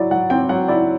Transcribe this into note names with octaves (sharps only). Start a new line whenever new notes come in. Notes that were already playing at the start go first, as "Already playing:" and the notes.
Already playing: F#3 E4 D5
F#3 F#5
C4 G5
F#3 F#5
E4 D5